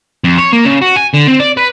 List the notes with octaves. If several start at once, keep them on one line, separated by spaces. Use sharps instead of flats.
F2
C#5
A#3
C#3
F#4
G#5
D3
C4
D5
B4